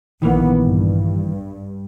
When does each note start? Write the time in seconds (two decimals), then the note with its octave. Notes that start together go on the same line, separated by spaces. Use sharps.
0.22 A#1 D#3 E3 A#3 B3
0.61 G2